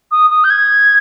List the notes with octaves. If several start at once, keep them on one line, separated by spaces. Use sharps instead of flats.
D#6
D#6
G6
G#6